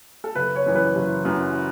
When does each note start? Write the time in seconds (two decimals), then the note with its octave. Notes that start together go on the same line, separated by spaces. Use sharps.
0.24 A4
0.35 F#1 B4
0.56 C#5
0.66 F#2 E3
0.75 B4
0.95 F#1
1.25 F#2 E3